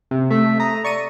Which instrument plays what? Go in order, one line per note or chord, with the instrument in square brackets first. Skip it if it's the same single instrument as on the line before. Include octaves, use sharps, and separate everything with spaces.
[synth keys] C3
[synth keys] A3 [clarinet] E5
[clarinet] A#5 [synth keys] D#6
[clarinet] D5 [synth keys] C#6 C#7 D#7